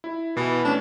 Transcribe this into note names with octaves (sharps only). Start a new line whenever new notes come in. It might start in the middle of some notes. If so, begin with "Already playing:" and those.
E4
B2 E3
A3 C#4 D4